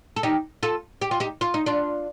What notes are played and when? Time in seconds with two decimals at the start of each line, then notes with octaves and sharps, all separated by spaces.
0.16 A4
0.23 D#4 G4
0.63 F4 A4
1.01 G4
1.11 F4
1.20 D#4 G4
1.41 F4
1.54 D#4
1.66 D4 F4